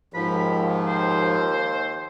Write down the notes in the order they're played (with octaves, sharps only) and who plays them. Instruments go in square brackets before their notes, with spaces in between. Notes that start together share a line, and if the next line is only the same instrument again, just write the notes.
[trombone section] D#2 [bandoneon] G#2 F3 [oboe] B5
[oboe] C5